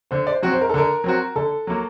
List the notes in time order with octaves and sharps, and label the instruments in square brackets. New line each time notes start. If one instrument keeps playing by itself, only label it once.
[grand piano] D3 [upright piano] C5
[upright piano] D5
C5
[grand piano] F#3 C4 F#4
[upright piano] C5
A#4
A4
[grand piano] D3 [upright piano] A#4
[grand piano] F#3 C4 F#4
[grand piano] D3 [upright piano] A4
[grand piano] F#3 A#3